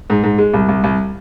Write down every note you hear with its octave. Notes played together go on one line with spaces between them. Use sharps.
G#2
G#2
G#3
C2
C2
C2